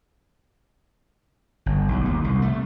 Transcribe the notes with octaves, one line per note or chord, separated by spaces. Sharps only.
G1
B1
D#2
C2
A3